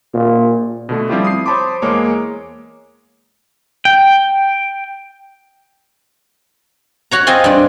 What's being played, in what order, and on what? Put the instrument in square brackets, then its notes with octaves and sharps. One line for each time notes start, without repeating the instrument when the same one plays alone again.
[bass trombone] A#2
[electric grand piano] B2 D3 A3
F3 G3 C4 E4 F4 G4
D#6 C7
C5 C#5 A5 B5 C6 D6
E2 G#3 A#3 C#5 D6
[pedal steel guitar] G5
[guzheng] F#4 C#5 A#5
C4 F4 D#5 G#5
G2 D4